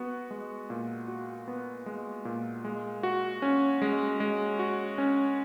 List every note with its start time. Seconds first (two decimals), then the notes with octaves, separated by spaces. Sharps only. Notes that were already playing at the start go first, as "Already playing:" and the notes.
Already playing: B3 F#4
0.31 G#3
0.70 A#2
1.08 F#4
1.48 B3
1.86 G#3
2.25 A#2
2.65 G#3
3.03 F#4
3.42 C#4
3.82 G#3
4.20 G#3
4.59 F#4
4.98 C#4